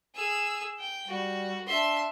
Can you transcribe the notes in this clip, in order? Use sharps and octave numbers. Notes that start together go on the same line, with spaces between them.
G#4 E6
G5
G3 F#4
D4 E5 C6